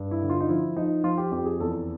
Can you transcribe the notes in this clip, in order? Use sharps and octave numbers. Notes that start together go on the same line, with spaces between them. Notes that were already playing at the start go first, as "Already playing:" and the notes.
Already playing: G2
E4
D3
F4
D#4
F3 E4
F3 D#4
F3 F4
G4
F2 G4
G#4
E2 A4